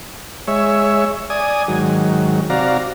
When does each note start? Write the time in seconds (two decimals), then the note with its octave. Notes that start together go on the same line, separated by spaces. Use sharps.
0.48 G#3 C#5 E5
1.30 D5 G#5 D#6
1.68 G#2 D#3 F#3
2.50 C3 F#4 D5 F5 A#5